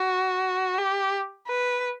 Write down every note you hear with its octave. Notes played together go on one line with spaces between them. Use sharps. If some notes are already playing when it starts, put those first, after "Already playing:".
Already playing: F#4
G4
B4